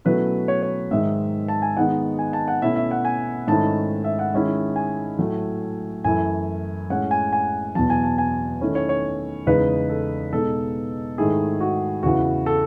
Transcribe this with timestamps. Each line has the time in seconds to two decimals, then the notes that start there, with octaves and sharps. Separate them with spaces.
0.05 B2 F#3 A3 C#4 E4 B4
0.48 C#5
0.63 C#5
0.91 G#2 D#3 G#3 E5
1.48 A5
1.62 G#5
1.77 D#3 G#3 B3 D#4 F#5
2.19 G#5
2.33 A5
2.48 F#5
2.62 B2 A3 C#4 E4 E5
2.76 E5
2.91 F#5
3.05 G#5
3.47 G#2 D#3 A3 C#4 E4 A5
4.04 E5
4.19 F#5
4.34 D#3 G#3 C#4 E4
4.76 G#5
5.19 A2 F#3 A3
6.04 F#2 E3 A3 E4 G#5
6.90 A2 G#3 C#4 F#5
7.11 G#5
7.33 G#5
7.75 E2 B2 F#3 A5
7.90 G#5
8.04 A5
8.18 G#5
8.61 D#3 A3 C#4 E4
8.75 C#5
8.89 C#5
9.46 E2 C#3 G#3 D#4 B4
9.89 A4
10.32 B2 G#3 D#4 A4
11.18 G#2 D#3 A3 E4 G#4
11.61 F#4
12.03 E2 C#3 E3 F#4
12.46 A4